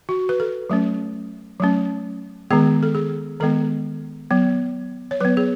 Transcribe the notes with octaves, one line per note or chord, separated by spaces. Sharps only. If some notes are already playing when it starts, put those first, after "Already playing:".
F#4
B4
A4
F#3 A3 C#4
F#3 A3 C#4
D#3 G#3 B3 G#4
A4
G#4
D#3 G#3 B3 A4
F#3 B3
C#5
F#3 B3 B4
G#4